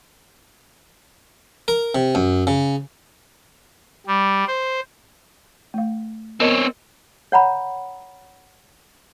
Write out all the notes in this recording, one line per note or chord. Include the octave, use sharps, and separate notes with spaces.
A#4
C3
F#2
C#3
G3
C5
A3 F5
B3 C4 A#4 C#5 D#5
C#5 F#5 A#5 B5